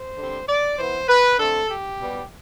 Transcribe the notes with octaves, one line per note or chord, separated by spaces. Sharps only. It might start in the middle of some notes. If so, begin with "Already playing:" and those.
Already playing: C5
D3 G3 C4
D5
E3 B3 C5
B4
D3 A3 C4 A4
G4
B2 G3 B3